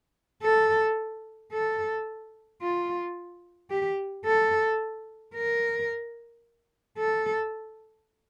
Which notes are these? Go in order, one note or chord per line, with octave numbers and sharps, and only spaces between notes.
A4
A4
F4
G4
A4
A#4
A4